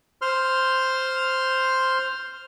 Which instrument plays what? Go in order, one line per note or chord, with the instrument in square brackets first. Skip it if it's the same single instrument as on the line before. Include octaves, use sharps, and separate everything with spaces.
[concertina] C5 C6 F6